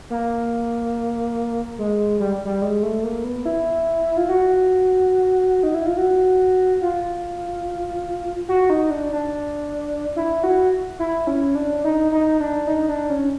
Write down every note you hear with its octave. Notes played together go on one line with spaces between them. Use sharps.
A#3
G#3
G3
G3
G#3
A3
A#3
B3
E4
F4
F#4
D#4
E4
F4
F#4
F4
F#4
D#4
D4
D4
E4
F#4
E4
C#4
D4
D#4
D#4
D4
D#4
D4
C#4